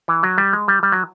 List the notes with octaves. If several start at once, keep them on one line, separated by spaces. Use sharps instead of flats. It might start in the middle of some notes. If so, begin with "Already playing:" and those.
E3
F#3
G3
G#3
G3
G3
F#3